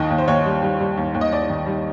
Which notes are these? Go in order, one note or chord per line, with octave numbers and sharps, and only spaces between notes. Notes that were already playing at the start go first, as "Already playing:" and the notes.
Already playing: D#2 D#3 D#5
D#2
C5
D#2 C#5
G3
G3
G3
D#2
D#2
D#5
D#2 D5
D#3
G3